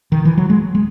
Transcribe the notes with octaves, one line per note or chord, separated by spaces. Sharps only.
D#3
E3
F#3
G#3
G#3